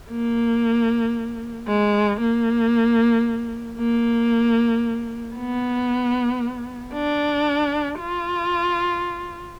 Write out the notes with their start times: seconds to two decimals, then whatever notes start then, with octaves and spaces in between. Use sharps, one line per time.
0.11 A#3
1.68 G#3
2.21 A#3
3.78 A#3
5.37 B3
6.94 D4
7.99 F4